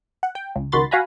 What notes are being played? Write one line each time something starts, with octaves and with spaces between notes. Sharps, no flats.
F#5
G5
C#2
C#2 D#3 F#4 B5 C6 A6
F#4 F5 F#5 G#5 A#5 B5